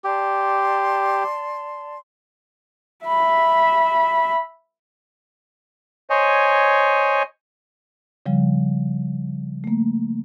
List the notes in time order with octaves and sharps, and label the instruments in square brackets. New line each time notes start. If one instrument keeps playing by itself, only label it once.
[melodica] G4 [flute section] D5 A5 C6
[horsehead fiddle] E5 B5
[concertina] C5 C#5 D#5 G#5
[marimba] C#3 F3 G3
A3 A#3